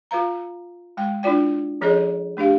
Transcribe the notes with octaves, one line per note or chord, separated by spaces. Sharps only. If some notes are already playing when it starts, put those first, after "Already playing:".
F4 B4 F5 A#5
G#3 G5
D4 E4 F4 D5 G5
F3 C#4 G#4 A4 C#5 D#5
A3 D4 G4 F5